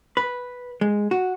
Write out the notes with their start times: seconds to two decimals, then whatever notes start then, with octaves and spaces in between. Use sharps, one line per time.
0.17 B4
0.81 G#3
1.11 F#4